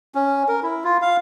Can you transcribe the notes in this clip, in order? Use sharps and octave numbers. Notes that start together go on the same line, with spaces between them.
C#4
A#4
E4
F4
F5